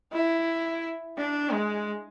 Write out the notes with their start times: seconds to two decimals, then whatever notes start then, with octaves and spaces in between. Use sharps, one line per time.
0.13 E4
1.18 D4
1.52 G#3